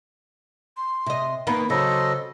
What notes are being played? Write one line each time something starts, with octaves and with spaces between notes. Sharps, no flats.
C6
C3 D#5
D#3 A#3 B3 B5
C#3 F#3 A4 C5 D#5